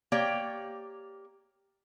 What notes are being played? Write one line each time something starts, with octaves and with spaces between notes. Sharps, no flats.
A#3 G4 C#5 D5 G5